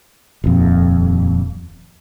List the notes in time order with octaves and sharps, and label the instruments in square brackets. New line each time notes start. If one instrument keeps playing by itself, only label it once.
[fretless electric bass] D#1 F2